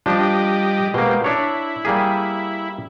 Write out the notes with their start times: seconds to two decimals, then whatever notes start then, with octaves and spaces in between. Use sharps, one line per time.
0.06 F3 G3 D4 G4 D#5
0.94 B2 G#3 A#3 G4 C5
1.24 D4 E4 C#5
1.85 G3 A#3 G#4